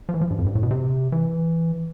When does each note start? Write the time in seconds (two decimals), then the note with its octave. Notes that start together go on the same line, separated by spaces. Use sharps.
0.09 F3
0.14 E3
0.21 F3
0.30 G2
0.39 F2
0.46 G2
0.55 A2
0.63 B2
0.71 C3
1.12 E3